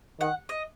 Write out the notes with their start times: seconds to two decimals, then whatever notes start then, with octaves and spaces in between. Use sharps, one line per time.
0.20 D#3 F#5
0.49 D#5